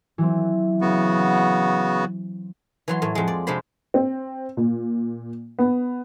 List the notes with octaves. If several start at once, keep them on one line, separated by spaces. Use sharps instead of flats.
E3 F#3 C4
C#3 B3 F#4
E3 F#3 C6
A2 F#3
F2 G#3
D5
C3 G#3 D4 C5 B5
C4
A#2
B3